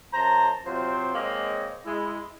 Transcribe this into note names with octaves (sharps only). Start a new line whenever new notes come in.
F#2 C5 A5 A#5
C3 F#3 C4 F4 C5
G#3 A#3 C4 C#5 D#5
G#3 E4